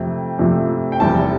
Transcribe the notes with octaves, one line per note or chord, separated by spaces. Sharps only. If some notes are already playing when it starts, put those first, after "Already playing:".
Already playing: F2 C3 F3 A3 G5
F2 C3 F3 A3
G5
F1 E2 C3 G3 A5